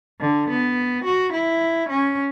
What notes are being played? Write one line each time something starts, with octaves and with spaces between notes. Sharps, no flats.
D3
B3
F#4
E4
C#4